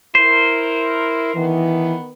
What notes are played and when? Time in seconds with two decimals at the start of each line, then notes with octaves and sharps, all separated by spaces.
0.15 E4 A#4 C5
1.36 D#3 E3 B3